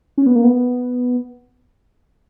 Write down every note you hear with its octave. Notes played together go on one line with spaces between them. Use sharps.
C#4
B3
A#3
B3